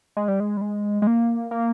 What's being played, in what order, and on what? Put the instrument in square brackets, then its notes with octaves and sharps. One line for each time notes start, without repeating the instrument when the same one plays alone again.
[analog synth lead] G#3
G3
G#3
G3
G#3
G#3
A#3
A#3